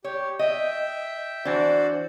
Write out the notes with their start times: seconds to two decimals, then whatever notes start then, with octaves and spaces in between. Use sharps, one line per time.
0.04 G4 C#5
0.39 D#5 E5 G5
1.45 E3 D4 F#4 C5 D5